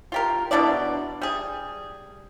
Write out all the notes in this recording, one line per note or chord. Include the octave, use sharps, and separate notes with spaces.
F4 G4 A#4
B2 D4 E4 D5
G3 G#4